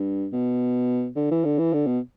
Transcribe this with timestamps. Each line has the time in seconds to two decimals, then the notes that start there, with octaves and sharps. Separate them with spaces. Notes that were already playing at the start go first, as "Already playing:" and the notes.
Already playing: G2
0.33 B2
1.16 D3
1.31 E3
1.45 D3
1.59 E3
1.74 D3
1.87 B2